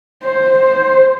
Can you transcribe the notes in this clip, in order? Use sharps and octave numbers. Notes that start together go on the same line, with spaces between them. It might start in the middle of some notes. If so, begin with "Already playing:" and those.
C5
C5